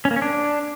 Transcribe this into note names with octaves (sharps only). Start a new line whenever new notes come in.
C#4
A#3
C#4
D4